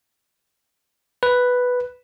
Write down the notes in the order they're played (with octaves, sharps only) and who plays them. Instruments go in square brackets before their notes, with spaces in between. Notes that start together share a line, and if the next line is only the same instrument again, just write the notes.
[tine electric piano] B4